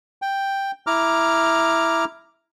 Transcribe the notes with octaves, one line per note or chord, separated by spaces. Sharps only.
G5
E4 A#5 D6 F6